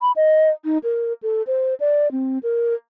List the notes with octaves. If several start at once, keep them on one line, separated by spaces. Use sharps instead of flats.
B5
D#5
D#4
A#4
A4
C5
D5
C4
A#4